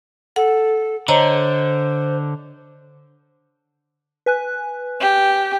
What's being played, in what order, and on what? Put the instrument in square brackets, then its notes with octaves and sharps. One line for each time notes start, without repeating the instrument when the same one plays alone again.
[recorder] A4 [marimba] F#5
[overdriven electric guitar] D3 [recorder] C5 [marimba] C#5 D#5 A#5
[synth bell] B4 G#5 F#6
[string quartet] G4